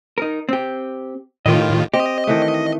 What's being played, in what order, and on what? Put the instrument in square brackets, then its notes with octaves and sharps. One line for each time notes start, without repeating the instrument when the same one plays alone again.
[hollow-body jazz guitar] D#4 A#4
C4 G4
[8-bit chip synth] A2 D#3 F4 [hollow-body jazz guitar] G4 D#5
[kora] C4 [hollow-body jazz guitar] G4 [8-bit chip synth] D#5
[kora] D#3 E3 A3